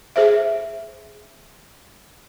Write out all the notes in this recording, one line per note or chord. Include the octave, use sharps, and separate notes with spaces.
G#4 C5 E5